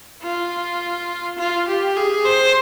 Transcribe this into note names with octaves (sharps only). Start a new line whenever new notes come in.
F4
F4
G4
G#4
C5